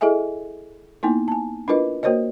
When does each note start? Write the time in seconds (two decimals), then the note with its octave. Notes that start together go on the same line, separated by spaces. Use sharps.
0.01 E4 G#4 A4 D#5 E5 G#5
1.03 A#3 B3 D#4 E4
1.28 G#5 A5
1.68 D4 E4 F4 A#4 B4 D#5
2.03 A#3 F#4 A#4 C5 C#5 D#5